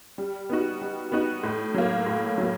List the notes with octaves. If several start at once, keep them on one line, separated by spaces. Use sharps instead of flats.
G3
B3 D#4 F#4
G3
B3 D#4 F#4
A2
F#3 A#3
A2
F#3 A#3